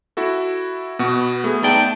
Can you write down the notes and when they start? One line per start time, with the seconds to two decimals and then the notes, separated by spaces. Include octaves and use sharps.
0.17 E4 F#4 A4
0.99 B2 B3 F#4
1.44 A3 G#4
1.63 D#4 D5 G5 A5